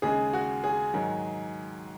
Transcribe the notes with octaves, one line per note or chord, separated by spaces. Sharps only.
D#2 C#3 G#3 G#4
F#4
G#4
G#2 D#3 F#3